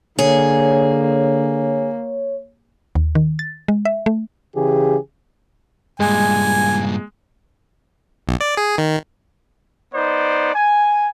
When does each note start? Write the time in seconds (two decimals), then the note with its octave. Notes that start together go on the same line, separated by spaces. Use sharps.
0.19 D3 A#3 G#4 C#5
2.95 D#2
3.15 D#3
3.39 A6
3.68 G#3
3.85 E5
4.06 A3
4.55 C#3 E3 G4 G#4
6.00 G2 A#2 G#3 G#5
8.28 B1
8.41 D5
8.57 G#4
8.78 D#3
9.94 B3 D#4 C5 D5
10.55 G#5